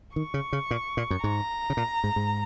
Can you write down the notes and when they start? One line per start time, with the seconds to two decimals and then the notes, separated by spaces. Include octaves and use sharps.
0.16 D#3 C#6
0.34 C#3
0.53 C#3
0.71 A#2
0.97 A#2
1.10 F#2
1.23 G#2 A#5
1.70 C#3
1.77 A#2
2.04 G#2
2.16 G#2